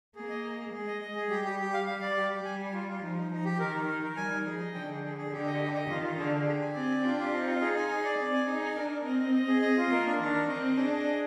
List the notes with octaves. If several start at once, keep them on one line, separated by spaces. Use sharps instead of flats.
A#3 G#4
D#5
G#4
G#4
G#3 G#4
D#5
D#5
G#4
G3 G4
G4
G4
F5
F5
D5
G4
G4
G3 G#5
G#5
F4
F4
F3 D#4
D#4
F3 D#4
G4
D#3 A#4
D#4
D#3 A#4
A#4
G3 G#5
D#4
F3 G#4
D#5
D3 G5
G#4
G#4
G#4
D3 G4
D#5
G4
D#5
D#3 F4
F4
D3 G#4
G#4
G4
G#5
C4 D5
G4
D4 F4
F4
C4 D#4
F4
G#4
G#5
G#4
D5
C4 D5
G#5
D#4 G#4
G#5
D4 A#4
A#4
C4 D#5
D#5
D#5
G#4
D#5
F4
A#3 A#4
D4
D#3 D4
A#4
C4 D#5
D#5
D4 G#4
D#5
G#4